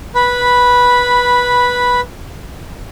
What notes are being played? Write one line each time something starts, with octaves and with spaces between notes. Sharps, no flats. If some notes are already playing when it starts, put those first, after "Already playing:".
B4 B5